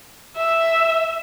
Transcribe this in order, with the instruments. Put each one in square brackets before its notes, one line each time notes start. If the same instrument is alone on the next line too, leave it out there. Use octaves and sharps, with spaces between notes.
[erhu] E5